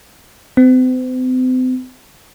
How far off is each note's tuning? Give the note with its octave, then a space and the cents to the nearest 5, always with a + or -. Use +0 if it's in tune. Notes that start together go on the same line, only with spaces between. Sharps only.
C4 -40